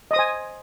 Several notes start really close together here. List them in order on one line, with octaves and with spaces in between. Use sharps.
D#5 D#6 C5 G#5